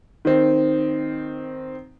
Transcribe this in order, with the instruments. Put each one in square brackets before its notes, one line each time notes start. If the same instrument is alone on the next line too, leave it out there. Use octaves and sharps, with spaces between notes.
[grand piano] D#3 C4